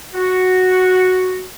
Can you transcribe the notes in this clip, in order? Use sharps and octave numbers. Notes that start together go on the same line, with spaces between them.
F#4